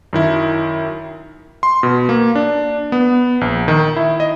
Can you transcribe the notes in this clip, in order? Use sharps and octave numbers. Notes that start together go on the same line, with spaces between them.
F#2 D#3 E4
C6
B2
A#3
D4
B3
A#1
D#3
E4
D#5